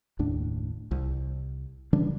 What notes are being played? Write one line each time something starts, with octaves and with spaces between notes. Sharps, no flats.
F#1 D#2 A2 D4
C2
C#3 E3 G3 D4